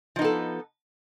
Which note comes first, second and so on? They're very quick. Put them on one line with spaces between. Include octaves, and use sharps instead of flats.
F3 D#4 B3 A4